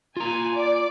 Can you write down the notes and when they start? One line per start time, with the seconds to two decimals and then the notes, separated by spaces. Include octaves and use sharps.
0.17 F4 G#5 A#5
0.55 D5 D6